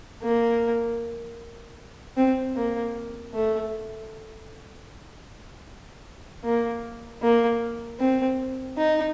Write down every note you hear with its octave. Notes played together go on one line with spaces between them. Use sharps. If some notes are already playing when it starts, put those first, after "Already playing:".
A#3
C4
A#3
A3
A#3
A#3
C4
D#4